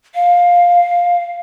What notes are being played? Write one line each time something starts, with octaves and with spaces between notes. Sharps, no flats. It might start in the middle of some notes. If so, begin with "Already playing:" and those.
F5